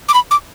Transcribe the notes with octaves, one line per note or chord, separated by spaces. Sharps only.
D6
B5
D6